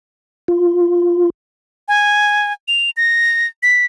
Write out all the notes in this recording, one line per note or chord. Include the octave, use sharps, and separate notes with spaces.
F4
G#5
F7
A#6
B6